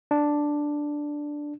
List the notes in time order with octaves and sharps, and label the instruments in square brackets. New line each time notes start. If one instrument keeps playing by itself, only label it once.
[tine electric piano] D4